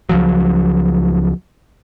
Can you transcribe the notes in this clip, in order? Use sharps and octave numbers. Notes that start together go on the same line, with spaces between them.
C#2 F3 F#3